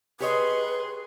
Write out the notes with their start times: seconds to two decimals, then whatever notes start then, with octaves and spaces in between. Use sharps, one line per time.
0.20 G4 G#4 B4 C#5 D#5 C6